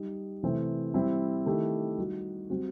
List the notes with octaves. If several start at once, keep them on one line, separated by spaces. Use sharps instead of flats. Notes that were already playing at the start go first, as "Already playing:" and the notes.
Already playing: G3 D#4 G4
C3 E3 A3 C4
G3 C4 E4
D#3 A3 E4 G4
G3 D#4 F#4
G3 C4 F#4